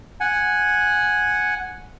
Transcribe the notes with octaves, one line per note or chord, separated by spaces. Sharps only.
F#5 G#5